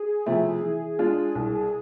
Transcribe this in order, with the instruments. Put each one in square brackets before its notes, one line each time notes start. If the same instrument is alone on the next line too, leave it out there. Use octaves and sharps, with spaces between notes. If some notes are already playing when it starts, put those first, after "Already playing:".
Already playing: [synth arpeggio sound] G#4
[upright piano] C3 F3 A3 E4
E3
G#3 D4 F4
C2